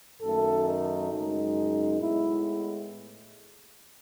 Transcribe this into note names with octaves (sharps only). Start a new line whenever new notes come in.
F#2 D#3 A3 A4
D#4
F#2 C#3 G#3 D#4
A2 G#3 B3 E4